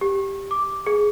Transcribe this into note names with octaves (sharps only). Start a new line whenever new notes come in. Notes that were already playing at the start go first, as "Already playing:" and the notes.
G4
D6
G#4